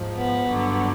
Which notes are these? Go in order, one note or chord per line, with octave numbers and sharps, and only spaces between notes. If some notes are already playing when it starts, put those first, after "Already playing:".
Already playing: G#2 F3
B3
G2 D3 F#3